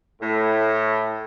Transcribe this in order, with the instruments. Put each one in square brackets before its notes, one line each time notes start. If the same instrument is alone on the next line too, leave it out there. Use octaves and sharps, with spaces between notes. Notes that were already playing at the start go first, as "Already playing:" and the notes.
[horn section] A2